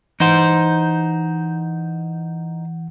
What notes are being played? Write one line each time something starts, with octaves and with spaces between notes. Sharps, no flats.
E3 D#4 C5 F#5 G6